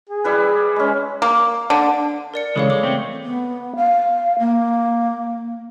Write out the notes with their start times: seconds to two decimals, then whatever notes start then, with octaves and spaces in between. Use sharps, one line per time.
0.09 G#4
0.24 G3 E4 B4
0.76 G#3 C#4
1.22 A#3
1.70 D3
2.34 A#4 D5 C#7
2.56 C#3 E3 G#3 A4 C#5 F5
2.70 G#3 D6
2.83 A3 C4
3.23 B3
3.76 F5
4.39 A#3